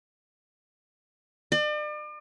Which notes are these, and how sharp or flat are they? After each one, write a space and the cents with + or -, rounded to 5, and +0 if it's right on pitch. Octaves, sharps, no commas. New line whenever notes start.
D5 +40